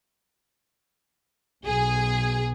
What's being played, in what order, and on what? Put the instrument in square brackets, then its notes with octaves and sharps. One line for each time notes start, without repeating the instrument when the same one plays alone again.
[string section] B1 G#4